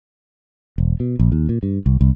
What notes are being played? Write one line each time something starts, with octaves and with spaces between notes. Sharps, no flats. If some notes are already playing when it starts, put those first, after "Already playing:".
E1
B2
A#1
D#2
A#2
G2
C2
C2